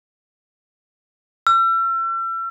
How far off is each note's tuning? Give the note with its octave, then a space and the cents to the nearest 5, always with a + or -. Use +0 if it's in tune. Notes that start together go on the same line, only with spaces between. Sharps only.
E6 +40